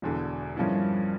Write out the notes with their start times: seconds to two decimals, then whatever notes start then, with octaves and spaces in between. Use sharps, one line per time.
0.02 E1 E2 D3
0.56 G2 F3 A#3 C#4 E4